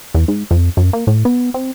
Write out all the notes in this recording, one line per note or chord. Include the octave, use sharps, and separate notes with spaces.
E2
G#2
F2
F#2
A#3
A2
B3
C4